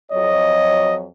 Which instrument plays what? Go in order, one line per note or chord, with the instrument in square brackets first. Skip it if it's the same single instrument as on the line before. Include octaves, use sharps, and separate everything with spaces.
[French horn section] F2 F#3 C#5 [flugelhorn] D#5